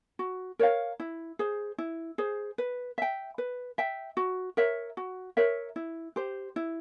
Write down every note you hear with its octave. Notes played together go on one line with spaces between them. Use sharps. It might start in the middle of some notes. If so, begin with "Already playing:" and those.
F#4
A#4 C#5 F5
E4
G#4 C5
E4
G#4 C5
B4
E5 G5
B4
E5 G5
F#4
A#4 C#5 E5
F#4
A#4 C#5 E5
E4
G4 C5
E4